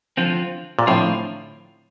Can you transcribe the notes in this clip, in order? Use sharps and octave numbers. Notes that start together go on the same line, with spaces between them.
D3 F3 C4 F4
A#2
A2 D3 F3 C4 F4